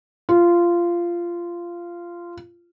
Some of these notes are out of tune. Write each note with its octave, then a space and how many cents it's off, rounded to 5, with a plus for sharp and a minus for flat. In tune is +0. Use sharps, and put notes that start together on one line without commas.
F4 -15